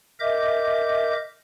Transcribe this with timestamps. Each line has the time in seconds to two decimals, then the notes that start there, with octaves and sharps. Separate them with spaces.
0.20 A#4 D#5 E5 D6 G6